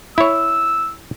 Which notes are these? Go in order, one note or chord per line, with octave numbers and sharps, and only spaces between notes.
E4 C#5 E6